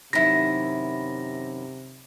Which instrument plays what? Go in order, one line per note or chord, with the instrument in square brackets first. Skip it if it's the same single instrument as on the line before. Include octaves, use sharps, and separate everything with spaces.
[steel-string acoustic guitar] F#2 D#3 [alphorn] C3 [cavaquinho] E4 B5 [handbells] A#6